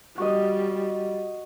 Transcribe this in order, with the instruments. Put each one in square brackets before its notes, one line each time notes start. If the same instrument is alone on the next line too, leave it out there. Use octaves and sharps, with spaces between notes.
[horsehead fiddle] G3 [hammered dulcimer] F#4 D#5